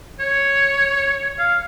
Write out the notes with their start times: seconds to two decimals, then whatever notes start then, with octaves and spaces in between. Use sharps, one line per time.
0.20 C#5
1.39 F5